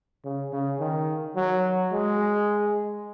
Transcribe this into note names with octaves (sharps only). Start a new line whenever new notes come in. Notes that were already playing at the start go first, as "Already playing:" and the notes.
C#3
C#3
D#3
F#3
G#3